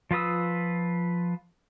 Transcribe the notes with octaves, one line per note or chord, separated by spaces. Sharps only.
F3 F4 B4 D#6 E6